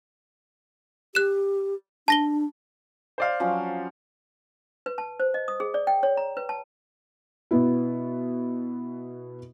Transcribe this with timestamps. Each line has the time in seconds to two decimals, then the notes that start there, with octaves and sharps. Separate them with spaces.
1.15 G4 F#6 E7
2.08 D4 A5 A#6 G7
3.18 C5 D5 F5
3.40 F3 F#3 C#4
4.86 B4
4.98 A5
5.20 C5
5.34 D#5
5.48 D#6
5.60 G#4
5.74 D5
5.87 G5
6.03 C#5
6.17 A#5
6.37 B4
6.49 A5
7.51 B2 B3 E4